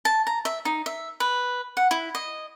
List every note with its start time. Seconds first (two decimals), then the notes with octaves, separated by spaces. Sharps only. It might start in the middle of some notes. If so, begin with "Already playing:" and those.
0.05 A5
0.27 A#5
0.45 E5
0.65 D#4
0.86 E5
1.20 B4
1.77 F#5
1.91 E4
2.15 D#5